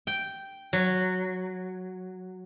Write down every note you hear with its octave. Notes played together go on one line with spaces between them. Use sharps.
G5
F#3